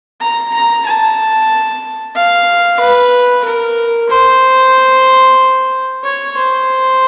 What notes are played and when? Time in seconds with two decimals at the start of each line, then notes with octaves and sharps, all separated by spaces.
0.21 A#5
0.54 A#5
0.86 A5
2.16 F5
2.80 B4
3.44 A#4
4.10 C5
6.04 C#5
6.37 C5